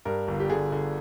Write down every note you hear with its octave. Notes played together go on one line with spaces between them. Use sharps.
G2 A#4
G1
G4
D3 G#4
D3